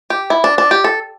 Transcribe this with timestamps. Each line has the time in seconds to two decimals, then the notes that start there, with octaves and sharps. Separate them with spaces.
0.10 G4
0.30 E4
0.44 D4
0.58 D4
0.71 G4
0.84 A4